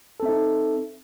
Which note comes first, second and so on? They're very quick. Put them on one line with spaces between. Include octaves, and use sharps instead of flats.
A4 C4 E5 D#4